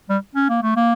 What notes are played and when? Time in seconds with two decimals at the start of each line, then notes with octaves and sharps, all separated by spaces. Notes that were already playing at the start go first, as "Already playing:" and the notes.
0.09 G3
0.35 C#4
0.49 A#3
0.63 A3
0.76 A#3